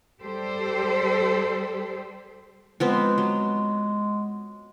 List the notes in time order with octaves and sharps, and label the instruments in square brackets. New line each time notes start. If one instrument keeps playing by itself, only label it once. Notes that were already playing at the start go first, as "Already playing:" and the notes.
[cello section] G3 G4 A4 C5
[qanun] F3 B3 C4 [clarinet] G#3
[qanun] F#3